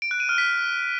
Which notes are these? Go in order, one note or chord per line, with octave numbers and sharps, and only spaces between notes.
D7
F#6
D#7
F6
B6